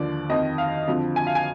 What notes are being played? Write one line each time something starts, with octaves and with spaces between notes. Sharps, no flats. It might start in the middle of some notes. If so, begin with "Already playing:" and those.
Already playing: D#2 D3 F3 D5
F2 D#3 D#5
F5
F2 D3 F3
G#5
F5
G#5